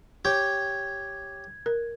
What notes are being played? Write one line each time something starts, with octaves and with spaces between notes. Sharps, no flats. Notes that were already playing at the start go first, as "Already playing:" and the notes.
G4 C#5 G5 G#6
A#4